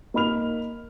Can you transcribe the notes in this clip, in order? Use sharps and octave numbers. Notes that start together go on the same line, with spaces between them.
A#3 D#4 B5 F6 F7